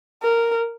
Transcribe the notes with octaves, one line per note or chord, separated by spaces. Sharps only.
A#4